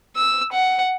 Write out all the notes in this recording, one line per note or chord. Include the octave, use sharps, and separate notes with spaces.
E6
F#5